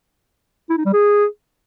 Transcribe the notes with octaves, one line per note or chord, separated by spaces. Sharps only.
E4
D#4
G3
G#4